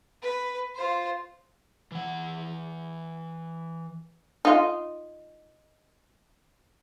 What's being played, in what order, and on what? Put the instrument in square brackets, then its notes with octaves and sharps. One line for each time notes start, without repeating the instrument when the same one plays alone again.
[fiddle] B4
F4 C5
[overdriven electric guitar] E3 F#5
[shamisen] D#4 F4